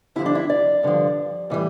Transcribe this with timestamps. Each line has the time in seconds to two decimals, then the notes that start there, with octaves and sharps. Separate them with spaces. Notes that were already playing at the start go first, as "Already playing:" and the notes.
0.16 G2 D3 F3 E4
0.26 D4
0.35 E4
0.50 D5
0.83 G2 D3 F3
1.50 A2 E3 G3